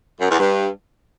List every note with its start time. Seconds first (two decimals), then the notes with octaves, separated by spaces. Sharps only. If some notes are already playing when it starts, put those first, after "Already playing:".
0.21 F#2
0.30 E2
0.39 G2